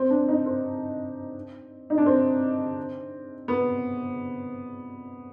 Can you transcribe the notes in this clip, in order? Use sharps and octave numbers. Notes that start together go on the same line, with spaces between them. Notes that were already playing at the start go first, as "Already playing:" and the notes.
Already playing: C4
D4
D#4
C4
D#4
D4
C4
B3